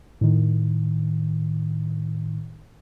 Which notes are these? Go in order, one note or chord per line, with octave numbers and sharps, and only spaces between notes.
A2 D#3